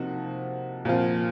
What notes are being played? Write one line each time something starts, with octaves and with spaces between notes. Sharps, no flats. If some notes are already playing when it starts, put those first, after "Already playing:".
Already playing: C3 F3 A#3 D#4 F#4
A#2 F3 C4 F4